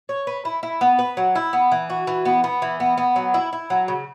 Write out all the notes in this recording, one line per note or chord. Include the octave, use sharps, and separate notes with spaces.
C#5
B4
E4
E4
B3
B4
F#3
E4
B3
E3
F#4
E3
B3
B3
E3
B3
B3
F#3
E4
E4
F#3
C#3